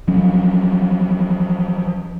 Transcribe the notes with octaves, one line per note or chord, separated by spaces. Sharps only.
F3 F#3 C#4